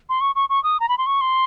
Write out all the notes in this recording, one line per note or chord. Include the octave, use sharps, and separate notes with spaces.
C6
C#6
C#6
C#6
D#6
A#5
B5
C6
C#6
C6